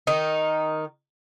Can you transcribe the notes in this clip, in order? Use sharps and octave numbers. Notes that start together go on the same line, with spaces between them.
D#3 D#4